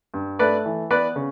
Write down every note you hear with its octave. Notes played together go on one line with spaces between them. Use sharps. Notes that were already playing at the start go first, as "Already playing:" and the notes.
G2
A3 B4 D5
E3
B3 B4 D5
C#3